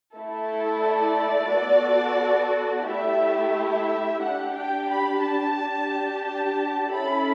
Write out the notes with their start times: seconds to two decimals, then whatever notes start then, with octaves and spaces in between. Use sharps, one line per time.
0.17 A3 E4 A4
0.84 D5
1.52 B3 F#4 A4
2.87 A3 E4 G4 E5
3.55 E5
4.23 D4 G4 F#5
4.57 G5
4.91 B5
5.24 A5
5.59 D4 G4
6.27 A5
6.94 C#4 E4 A4 B5